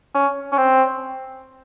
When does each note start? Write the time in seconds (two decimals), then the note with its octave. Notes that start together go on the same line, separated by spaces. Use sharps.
0.15 C#4
0.52 C#4
0.58 C4